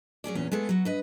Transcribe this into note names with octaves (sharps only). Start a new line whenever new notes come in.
F#3 C#4 G#4 D5
E2 A#2 C#4
G#3 A3 B3 G#4 A4
F#3 F#4
G2 B4 D#5